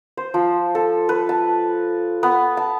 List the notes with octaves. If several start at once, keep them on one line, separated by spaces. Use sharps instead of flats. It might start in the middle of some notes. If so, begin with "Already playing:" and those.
C5
F3
A4
B4
A5
B3
A5